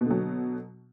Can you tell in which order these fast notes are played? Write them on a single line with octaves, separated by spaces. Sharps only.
B2 D3 F#3